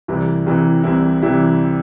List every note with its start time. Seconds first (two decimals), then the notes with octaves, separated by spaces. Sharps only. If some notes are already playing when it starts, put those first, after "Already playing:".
0.08 C2 C3 E3 G3 E4
0.46 C2 C3 E3 G3 E4
0.84 C2 C3 E3 G3 E4
1.22 C3 E3 G3 E4